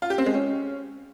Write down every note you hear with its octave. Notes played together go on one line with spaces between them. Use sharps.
F4
G4
C4
G#3
C#4